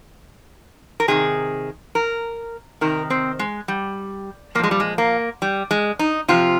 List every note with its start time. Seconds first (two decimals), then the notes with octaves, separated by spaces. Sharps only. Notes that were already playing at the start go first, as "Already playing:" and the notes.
1.00 A#4
1.08 C3 D#3 G#4
1.95 A#4
2.81 C3 D#3 A#4
3.10 C4
3.39 G#3
3.68 G3
4.55 A#2 A#3
4.59 F3 G#3
4.71 G3
4.80 G#3
4.98 A#3
5.42 G3
5.71 G#3
5.99 D#4
6.28 C3 F3 F4